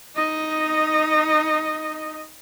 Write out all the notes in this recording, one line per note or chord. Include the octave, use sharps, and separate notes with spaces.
D#4 D#5